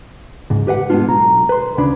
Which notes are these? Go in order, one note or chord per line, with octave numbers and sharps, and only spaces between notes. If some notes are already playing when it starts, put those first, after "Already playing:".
C#2 G#2
G4 B4 E5 F#5
G#2 G#3 B3 D4 F4
B1 A#5
B4 C6
D2 C#3 D4 B5